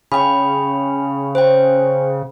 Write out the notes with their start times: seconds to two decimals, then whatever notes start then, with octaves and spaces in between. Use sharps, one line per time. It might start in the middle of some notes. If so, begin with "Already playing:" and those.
0.12 C#3 G5 B5
1.35 C5 G5